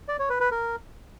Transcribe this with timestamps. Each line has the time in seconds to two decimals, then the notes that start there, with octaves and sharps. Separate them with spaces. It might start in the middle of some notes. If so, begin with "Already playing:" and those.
0.08 D5
0.19 C#5
0.30 B4
0.40 B4
0.51 A#4